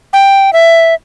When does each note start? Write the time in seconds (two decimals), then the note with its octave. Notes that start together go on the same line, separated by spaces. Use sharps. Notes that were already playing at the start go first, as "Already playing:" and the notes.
0.13 G5
0.53 E5